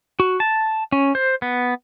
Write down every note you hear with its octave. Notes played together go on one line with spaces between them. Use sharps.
F#4
A5
C#4
C5
B3